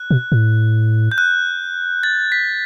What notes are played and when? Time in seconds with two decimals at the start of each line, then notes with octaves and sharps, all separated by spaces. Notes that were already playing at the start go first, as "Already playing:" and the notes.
Already playing: F#6
0.11 B2
0.32 A2
1.12 G6
1.18 F#6
2.03 A6
2.32 B6